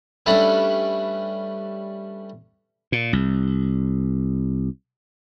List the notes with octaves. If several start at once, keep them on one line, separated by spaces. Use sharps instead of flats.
G3 A3 C#4 D4 A4 B4
A#2
C2